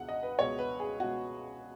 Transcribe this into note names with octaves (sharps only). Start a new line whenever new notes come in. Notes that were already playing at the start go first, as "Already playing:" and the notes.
Already playing: C#2 B2 G#3 F#5
D#5
B4
C#2 B2 G#3 C#5
B4
G#4
C#2 B2 G#3 F#4